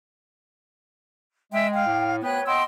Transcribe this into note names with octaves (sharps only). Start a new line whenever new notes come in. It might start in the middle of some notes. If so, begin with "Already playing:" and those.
G#3 E5 G5
F5 G5
A2
D2 B3 B4 C#5 G5 F#6
B3 D#5 G5 C6 E6